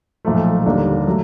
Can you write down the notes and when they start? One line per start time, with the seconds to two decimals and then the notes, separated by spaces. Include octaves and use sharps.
0.25 B1 A#2 F3 A3
0.66 D#2 D3 G3 A#3 D4
1.07 F#3 A3